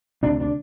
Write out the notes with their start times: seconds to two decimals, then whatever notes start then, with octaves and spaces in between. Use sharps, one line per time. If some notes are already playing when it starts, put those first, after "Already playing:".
0.23 D2 C3 D4
0.40 D4